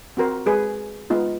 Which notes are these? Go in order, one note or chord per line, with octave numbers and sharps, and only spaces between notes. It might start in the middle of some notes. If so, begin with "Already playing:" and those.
C4 F#4 A#4 C5
G#3 G#4 B4
G#3 B3 D#4 F4